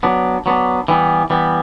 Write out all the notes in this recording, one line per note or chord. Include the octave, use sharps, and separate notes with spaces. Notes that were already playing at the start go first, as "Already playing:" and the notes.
F#3 B3 D4
F#3 B3 D4
E3 G3 B3
E3 G3 B3